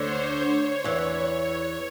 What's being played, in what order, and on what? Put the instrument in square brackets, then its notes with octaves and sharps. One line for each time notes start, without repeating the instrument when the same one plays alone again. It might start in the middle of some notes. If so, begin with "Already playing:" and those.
Already playing: [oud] D2 D3 [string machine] C5 C#5
[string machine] C#5
[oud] E2 E3